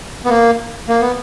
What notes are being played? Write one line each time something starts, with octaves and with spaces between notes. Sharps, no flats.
B3
A#3
A#3
B3